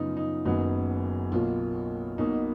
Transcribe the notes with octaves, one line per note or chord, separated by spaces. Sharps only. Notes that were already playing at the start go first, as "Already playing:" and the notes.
Already playing: F#2 C#3 F3 B3 D#4 F4
D#4
F#1 F#2 D#3 F#3 B3 D#4
B1 B2 A#3 F4
B1 B2 A#3 D#4